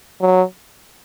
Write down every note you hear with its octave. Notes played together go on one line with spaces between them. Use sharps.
F#3